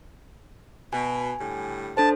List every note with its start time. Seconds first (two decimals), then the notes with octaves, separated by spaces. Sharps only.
0.93 B2 G#5
1.40 A2 D3 G3
1.97 D4 A4 C5 A5